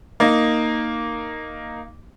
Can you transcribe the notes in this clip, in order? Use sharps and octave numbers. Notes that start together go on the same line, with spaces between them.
A#3 D#4